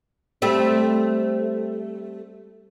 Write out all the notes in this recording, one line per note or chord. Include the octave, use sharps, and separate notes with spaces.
G3 A3 C4